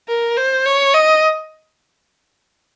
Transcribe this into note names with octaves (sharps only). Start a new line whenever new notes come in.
A#4
C5
C#5
D#5